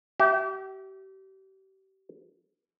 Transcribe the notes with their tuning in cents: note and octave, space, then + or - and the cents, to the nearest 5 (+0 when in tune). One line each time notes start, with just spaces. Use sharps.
G4 -35 E5 +0